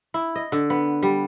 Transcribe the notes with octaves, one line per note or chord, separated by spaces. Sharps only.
E4
D#5
D3
B3
G3